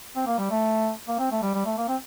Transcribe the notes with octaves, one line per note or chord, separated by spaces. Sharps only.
C4
A#3
G3
A3
A#3
C4
A3
G3
G3
A3
A#3
C4